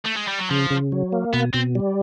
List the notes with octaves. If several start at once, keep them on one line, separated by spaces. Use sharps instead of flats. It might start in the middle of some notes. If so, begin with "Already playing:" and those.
A3
G#3
G3
F#3
C#3 F3
C#3
F#3
A#3
B2 B3
B2 C4
G3